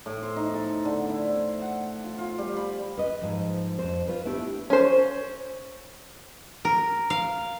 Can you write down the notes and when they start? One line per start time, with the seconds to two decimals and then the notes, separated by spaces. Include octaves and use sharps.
0.06 A2
0.23 C5
0.36 D#4
0.54 A4
0.85 D3
1.10 E4
1.36 C5
1.62 F#5
2.03 F4
2.18 F4
2.38 G3
2.57 B5
2.97 B4 D#5
3.21 G#2 F3
3.79 F2 C5
4.07 F4 B4
4.25 A3 B3 D4 E4 G4
4.70 C#4 C5
6.65 A#4
7.10 F5